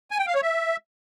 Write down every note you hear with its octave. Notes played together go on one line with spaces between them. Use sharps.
G#5
G5
F5
C#5
E5